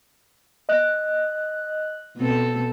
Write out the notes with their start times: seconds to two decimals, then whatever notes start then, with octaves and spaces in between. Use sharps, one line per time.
0.69 D#5 F#6
2.17 B2 C4 A4